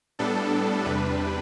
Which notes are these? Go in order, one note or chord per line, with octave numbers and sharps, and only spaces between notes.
A2 G3 B3 D4 A4
E2 C3 G3 D4 B4